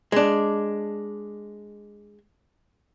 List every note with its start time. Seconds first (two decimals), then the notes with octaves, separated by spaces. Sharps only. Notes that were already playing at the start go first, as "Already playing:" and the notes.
0.12 G#3 D4